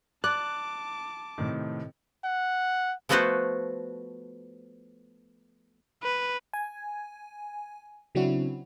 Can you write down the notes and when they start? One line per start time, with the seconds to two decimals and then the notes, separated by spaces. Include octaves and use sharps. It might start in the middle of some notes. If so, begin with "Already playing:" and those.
0.24 D5 A5 D6 F#6
1.38 A2 C3 D#3
2.24 F#5
3.09 F3 A3 B3 F#4 B4 C5
6.03 B4
6.53 G#5
8.15 C#3 F#3 C4 D4 E4 F#4